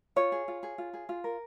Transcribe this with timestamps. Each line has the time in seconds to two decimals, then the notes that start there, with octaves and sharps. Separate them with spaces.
0.16 F4 C#5
0.32 G#4
0.48 F4
0.63 G#4
0.78 F4
0.94 G#4
1.09 F4
1.24 A#4